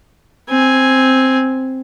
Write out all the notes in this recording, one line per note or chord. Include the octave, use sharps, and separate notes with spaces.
C4 G#5